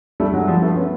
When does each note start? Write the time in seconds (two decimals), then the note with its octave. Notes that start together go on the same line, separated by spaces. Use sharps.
0.20 G3 A3
0.33 F#3 G#3
0.47 F3 G3
0.61 A3 B3
0.76 B3 C#4